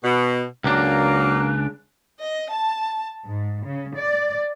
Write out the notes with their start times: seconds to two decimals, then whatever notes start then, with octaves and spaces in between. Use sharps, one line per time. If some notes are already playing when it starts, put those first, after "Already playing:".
0.03 B2
0.64 C#2 F#3 A#3 D4
2.22 D#5
2.52 A5
3.25 G#2
3.66 C#3
3.95 D5